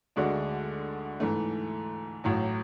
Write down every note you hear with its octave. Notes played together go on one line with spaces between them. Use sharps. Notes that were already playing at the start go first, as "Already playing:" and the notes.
D2 D3 G#3 D4 F#4
G#2 E3 A3
A1 A2 F#3